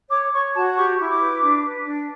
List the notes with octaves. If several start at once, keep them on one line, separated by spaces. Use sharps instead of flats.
C#5 D6
C#5 C#6
F#4 A5
G4 C#6
E4
C#6
D6
B4
D4
B4
D4